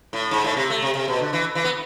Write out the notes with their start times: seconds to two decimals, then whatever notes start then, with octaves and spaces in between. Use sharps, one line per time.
0.13 A2
0.31 G#2
0.44 A2
0.57 C3
0.70 A3
0.82 C3
0.95 C3
1.08 B2
1.20 D3
1.33 E3
1.55 E3
1.64 B3